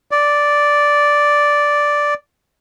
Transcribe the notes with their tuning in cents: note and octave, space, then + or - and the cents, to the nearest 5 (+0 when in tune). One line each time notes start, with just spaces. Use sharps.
D5 -5